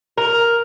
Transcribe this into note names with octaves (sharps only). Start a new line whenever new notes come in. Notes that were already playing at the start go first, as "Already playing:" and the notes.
A#4